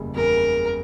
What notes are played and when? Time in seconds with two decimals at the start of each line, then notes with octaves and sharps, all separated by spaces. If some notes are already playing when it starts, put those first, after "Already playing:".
Already playing: F#1 E2 C#3 G3
0.15 F#1 E2 C#3 G3 A#4